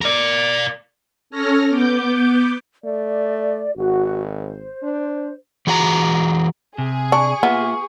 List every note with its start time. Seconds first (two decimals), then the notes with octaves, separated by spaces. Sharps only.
0.01 A#4 D5
1.30 C#4 A4 C#5 F6 A#6
1.69 B3 D6 G6
2.84 A3 D5
3.77 G#1 F#4
4.38 C5
4.82 D4
5.67 E3 F#4 G#4 E5 A#5
6.78 C3 G#4
7.12 D4 C#6
7.43 A#3 B3 F4 E5